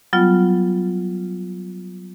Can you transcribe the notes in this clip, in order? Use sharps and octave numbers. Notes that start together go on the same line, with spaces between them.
F#3 G3 B3 F4